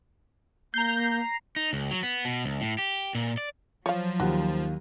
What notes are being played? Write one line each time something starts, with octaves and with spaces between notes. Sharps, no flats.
A#3 A#5 G6 C7
D#4
C#2
F#3
B3
B2
C#2
A2
G4
A#2
D5
F3 F#3 C#5 F5
D#2 F#4